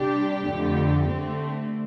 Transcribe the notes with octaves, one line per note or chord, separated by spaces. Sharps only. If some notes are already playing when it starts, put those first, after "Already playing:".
Already playing: C3 G3 D4 G4
F2 D3 A3
D3 A3 C4